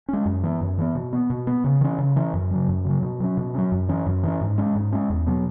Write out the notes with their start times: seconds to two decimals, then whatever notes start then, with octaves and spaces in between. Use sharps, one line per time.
0.09 G#3 C#4
0.25 F#2
0.43 E3 B3
0.61 F#2
0.78 E3 B3
0.95 B2
1.13 B3
1.30 B2
1.47 B3
1.64 C#3
1.81 E3 C#4
1.98 C#3
2.16 E3 C#4
2.33 F#2
2.51 C#3 F#3
2.68 F#2
2.85 C#3 F#3
3.03 B2
3.20 F#3 C#4
3.37 B2
3.54 F#3 C#4
3.72 F#2
3.89 E3 C#4
4.06 F#2
4.23 E3 C#4
4.41 G#2
4.58 G#3 C#4
4.75 G#2
4.93 G#3 C#4
5.10 E2
5.27 B2 F#3 B3